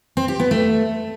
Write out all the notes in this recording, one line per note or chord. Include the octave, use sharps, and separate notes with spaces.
C4
G4
B3
A3